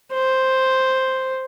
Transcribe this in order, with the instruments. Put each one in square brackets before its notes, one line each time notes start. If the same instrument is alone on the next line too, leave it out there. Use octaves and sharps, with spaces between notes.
[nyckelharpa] C5